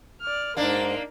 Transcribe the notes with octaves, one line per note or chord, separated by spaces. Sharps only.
D5 F6
G#2 A#3 D4 D#4 A#4